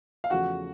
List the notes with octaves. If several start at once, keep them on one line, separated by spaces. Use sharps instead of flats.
F5
E2 C#3 F3 A3 F#4 F#5